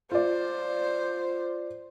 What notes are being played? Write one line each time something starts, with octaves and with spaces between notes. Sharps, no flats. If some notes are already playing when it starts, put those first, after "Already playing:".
F4 C5 D5